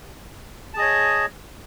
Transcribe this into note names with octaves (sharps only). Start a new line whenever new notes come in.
G#4 C#5 D#5 A5